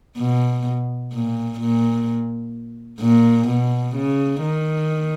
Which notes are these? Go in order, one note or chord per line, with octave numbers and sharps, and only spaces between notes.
B2
A#2
A#2
A#2
B2
C#3
D#3